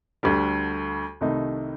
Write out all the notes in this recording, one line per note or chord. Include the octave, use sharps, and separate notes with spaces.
D2 D3 G3
C2 C3 D#3 A3 D#4